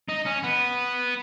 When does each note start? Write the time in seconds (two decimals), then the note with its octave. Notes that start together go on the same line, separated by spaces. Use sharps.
0.09 D#4
0.25 C#4
0.43 B3